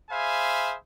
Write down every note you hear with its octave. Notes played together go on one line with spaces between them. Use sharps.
G#4 C5 E5 F5 G#5 B5